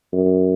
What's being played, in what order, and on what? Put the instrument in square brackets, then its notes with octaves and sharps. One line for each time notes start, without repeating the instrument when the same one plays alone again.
[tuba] F#2